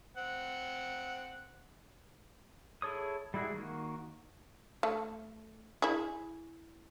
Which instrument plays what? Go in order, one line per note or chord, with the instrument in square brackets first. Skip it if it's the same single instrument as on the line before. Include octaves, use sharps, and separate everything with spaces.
[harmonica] C4 F#5
[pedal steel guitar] E4 G#4 A4 C#5 D#6
G3 G#3 E4 F#4 G#4
D#3 A#3 F#4
[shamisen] A3 A4
E4 G#4